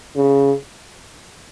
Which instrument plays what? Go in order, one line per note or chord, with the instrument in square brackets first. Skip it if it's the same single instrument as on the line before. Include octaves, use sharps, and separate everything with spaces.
[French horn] C#3